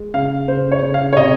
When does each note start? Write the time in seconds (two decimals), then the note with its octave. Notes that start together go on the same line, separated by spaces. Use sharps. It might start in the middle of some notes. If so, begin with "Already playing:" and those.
Already playing: G#3
0.14 C#3 F5
0.48 C#3 C5
0.72 C#5
0.83 C#3
0.94 F5
1.13 C#5
1.17 C3 D#5